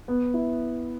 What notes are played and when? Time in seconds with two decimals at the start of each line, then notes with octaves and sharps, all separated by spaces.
0.08 B3
0.34 E4